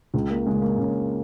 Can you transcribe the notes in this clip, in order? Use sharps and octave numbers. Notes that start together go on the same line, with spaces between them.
C#2
A#3
C#3 G#3
A#3
C#2 C#4